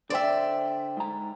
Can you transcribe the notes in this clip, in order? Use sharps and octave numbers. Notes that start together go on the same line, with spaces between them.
D3 C5 D5 E5 G5
G#2 A#5